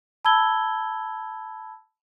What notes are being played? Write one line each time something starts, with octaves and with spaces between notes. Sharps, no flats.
A5 B5 E6 G#6 G7